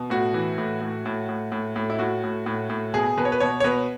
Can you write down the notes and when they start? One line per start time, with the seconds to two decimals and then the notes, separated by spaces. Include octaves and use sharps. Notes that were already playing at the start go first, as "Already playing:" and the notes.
Already playing: B2
0.10 A2 F#4
0.34 E3
0.58 A2
0.81 A2
1.06 A2
1.29 A2
1.52 A2
1.76 A2
1.90 E4
1.99 A2 F#4
2.24 A2
2.46 A2
2.70 A2
2.94 B2 G#4
3.17 B2 B4
3.25 C#5
3.32 B4
3.40 B2 C#5
3.60 C#5
3.64 B2 B4